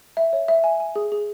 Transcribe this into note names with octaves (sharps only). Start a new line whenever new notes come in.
E5
C#5
E5
G#5
G#5
G#4
G#4